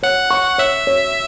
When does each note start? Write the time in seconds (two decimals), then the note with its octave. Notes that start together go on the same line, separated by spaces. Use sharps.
0.03 C#5 F#5
0.31 C#6
0.58 C#5 E5
0.87 C#5